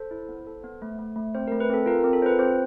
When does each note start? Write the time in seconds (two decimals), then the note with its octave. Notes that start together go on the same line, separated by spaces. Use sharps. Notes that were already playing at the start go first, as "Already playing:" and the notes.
Already playing: A4 C5
0.11 E4
0.28 B3
0.47 A4
0.64 B3
0.82 A3
0.99 A3
1.16 A3
1.35 C4 C5
1.47 A3 A#4
1.60 B4
1.70 C4 A4
1.86 F4 A#4
2.00 C4 A#4
2.13 A4
2.22 F4 B4 C5
2.39 C4 C5